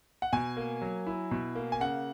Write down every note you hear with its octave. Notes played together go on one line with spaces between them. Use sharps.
F#5
B2 G#5
A#3
F#3
E4
B2
A#3
G#5
C#3 F#5